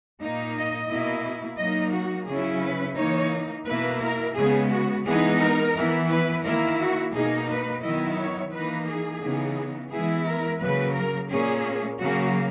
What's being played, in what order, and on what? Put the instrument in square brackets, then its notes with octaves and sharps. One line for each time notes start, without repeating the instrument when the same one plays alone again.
[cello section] A#2 A#3 D#4
D#5
B2 A#3 E4
F#3 A#3 D#4 D#5
F#4
C#3 F#3 C#4 E4 G#4
B4
E3 A#3 D#4 C#5
B2 A#3 E4 B4
A#4
C#3 G#3 B3 G#4
F#4
E3 G#3 B3 D#4 G#4
A#4
E3 B3 E4
B4
D#3 A#3 E4 A#4
F#4
B2 A#3 D#4 G#4
B4
D#3 F#3 B3 E4 D#5
C#5
E3 A#3 D#4 B4
G#4
C#3 E3 B3 D#4
E3 G#3 B3 E4 G#4
A#4
C#3 F#3 A#3 B4
A#4
A#2 A#3 C#4 G#4
C#3 F#3 A#3 F#4